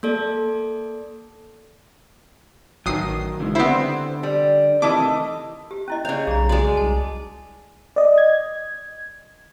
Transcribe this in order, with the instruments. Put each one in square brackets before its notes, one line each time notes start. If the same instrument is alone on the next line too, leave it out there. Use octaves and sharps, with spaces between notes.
[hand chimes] A#3 A4 D5
[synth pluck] A1 D#6 C7 [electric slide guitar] D#3 F#3
[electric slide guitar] C#3 E3 G#3
[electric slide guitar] D3 [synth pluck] B3 E4 [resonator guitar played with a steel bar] C4 G4 C5
[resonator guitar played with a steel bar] G3
[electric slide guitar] C3 D#3 E3 [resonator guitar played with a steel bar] A3 E4 D#5 [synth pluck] D6
[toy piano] G4
C#4 E4 D#5
[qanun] C#3 F5 [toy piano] C#5 D5
[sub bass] B1 [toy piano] G#4 A#5
[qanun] G#3 D5 [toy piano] F#4
[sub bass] C2 [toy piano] A5
[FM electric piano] D5 D#5
G#6